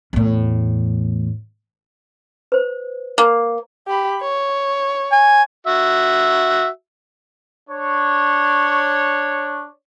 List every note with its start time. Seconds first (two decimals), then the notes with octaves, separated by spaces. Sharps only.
0.13 E2 A2
2.52 B4 C5
3.18 A#3
3.87 G4 B5
4.21 C#5
5.12 G#5
5.66 F#4 E5
7.69 D4 C#5